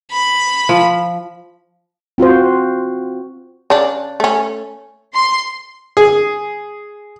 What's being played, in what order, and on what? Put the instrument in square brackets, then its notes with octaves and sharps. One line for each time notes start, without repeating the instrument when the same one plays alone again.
[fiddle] B5
[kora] F3
[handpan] C4 F4 F#4 C5
[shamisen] C#3 D4
A3 C#4
[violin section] C6
[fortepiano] G#4